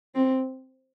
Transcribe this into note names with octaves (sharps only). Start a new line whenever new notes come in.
C4